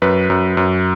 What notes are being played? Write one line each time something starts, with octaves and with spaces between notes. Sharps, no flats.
F#2 B4
F#2
F#2